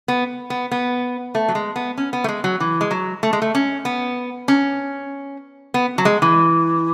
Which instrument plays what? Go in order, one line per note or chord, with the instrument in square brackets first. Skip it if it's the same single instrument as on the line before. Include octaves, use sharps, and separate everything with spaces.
[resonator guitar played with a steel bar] B3
B3
B3
A3
F#3
G#3
B3
C#4
B3
A3
G#3
F#3
E3
G#3
F#3
A3
G#3
A3
C#4
B3
C#4
B3
F#3
G#3
E3